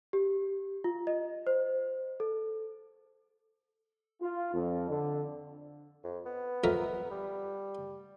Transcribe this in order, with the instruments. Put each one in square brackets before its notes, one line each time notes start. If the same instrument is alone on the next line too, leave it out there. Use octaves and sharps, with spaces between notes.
[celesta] G4
F4
D#5
C5
A4
[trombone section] F4
F2
D3
[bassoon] F2
B3
[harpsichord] F2 A#4 E5
[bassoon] G3